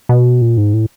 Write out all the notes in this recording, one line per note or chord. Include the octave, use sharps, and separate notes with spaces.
B2
A#2
G#2
A2